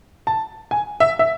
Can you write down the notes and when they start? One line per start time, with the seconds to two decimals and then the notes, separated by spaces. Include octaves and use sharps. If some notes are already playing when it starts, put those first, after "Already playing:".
0.27 A5
0.71 G#5
1.00 E5
1.19 E5